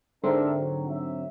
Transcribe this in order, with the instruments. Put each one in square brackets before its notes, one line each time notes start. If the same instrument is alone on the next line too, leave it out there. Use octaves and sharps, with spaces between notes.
[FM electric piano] G#2 D3 C4 [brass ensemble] D4 A#4 E5
[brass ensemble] F#3
F#3 E5